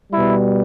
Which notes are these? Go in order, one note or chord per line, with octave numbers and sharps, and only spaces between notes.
B2 G3 E4